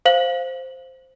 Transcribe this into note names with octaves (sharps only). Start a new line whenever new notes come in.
C5 F5 F#7